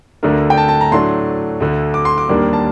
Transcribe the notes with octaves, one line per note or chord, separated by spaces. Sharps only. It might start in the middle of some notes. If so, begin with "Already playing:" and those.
D2 D3 A3 D4 A#4
G5
A5
A5
A#5
A2 F#3 A3 D4 C6
D2 D3 A3
D6
C6
D6
D#2 D#3 G3 A#3 D4
A5